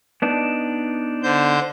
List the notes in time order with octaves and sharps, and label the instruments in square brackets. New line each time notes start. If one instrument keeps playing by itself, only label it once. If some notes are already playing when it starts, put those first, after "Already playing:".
[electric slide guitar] B3 D4 D#4
[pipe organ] D3 C5 G6